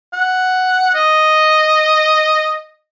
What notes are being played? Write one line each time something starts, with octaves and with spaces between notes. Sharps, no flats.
F#5
D#5